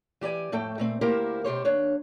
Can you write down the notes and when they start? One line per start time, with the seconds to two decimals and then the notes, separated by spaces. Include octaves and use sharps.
0.21 E3 G4 D5 G#5
0.52 F2 A2 A3 A4 G5
0.78 A#2 A3 C4
1.01 D2 A#3 E4 G4 A#4 C5
1.44 B2 G4 C5 C#5
1.65 D#2 D4 C#5